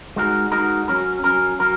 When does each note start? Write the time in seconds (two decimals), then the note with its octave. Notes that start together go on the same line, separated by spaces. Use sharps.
0.16 G#3 D#4 F#4 A#4
0.52 G#3 D#4 F#4 A#4
0.88 F#3 C#4 A#4
1.24 F#3 C#4 A#4
1.60 F#3 C#4 A#4